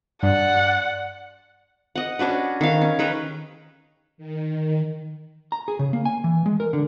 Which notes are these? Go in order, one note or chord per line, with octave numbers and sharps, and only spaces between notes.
G2 D5 F#5
D#5 F#5
C#4 D4 F#4 B4
D#3 F5
C#4
D#3 A#4 B4 G5
D#3
A#5
G#4
C#3
A#3
G#5
E3
G#3
A#4
D3